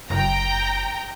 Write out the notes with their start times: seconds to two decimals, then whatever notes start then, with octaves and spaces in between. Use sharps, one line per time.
0.10 F#1 G5 A#5